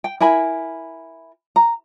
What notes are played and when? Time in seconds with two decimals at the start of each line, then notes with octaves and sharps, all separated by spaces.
0.04 G5
0.20 E4 A#4 G#5 B5
1.56 A#5